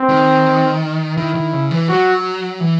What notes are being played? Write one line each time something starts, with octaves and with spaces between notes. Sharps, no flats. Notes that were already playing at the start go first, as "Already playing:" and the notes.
Already playing: C4
D#3
D#3 E4
D#3
C#3
E3
F#3 F#4
E3